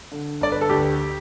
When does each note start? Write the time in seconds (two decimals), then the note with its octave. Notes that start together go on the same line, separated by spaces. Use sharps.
0.12 D3
0.41 G1 D5
0.52 B4
0.61 A4
0.70 D2 G4